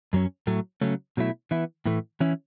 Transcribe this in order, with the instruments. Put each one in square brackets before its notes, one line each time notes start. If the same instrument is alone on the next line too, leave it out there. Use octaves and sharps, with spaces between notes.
[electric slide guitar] F#2 F#3 C#4
A2 F#3 A3
C#3 F#3 A3 C#4
B2 F#3 A3 E4
E3 B3 E4
A2 E3 A3
E3 C#4 E4